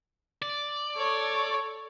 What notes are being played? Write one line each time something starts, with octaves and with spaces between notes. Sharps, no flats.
D5
A4 C#5